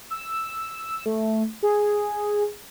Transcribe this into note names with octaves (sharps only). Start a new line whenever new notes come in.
E6
A3
G#4